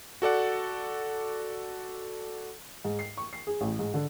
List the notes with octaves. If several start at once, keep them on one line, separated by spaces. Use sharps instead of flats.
F#4 A4 D5 F#5
G#2
C7
C#6
C7
G#4
A1
G#2
D3